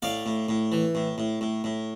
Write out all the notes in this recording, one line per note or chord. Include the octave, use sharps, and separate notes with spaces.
A2 D5 F5
A2
A2
E3
A2
A2
A2
A2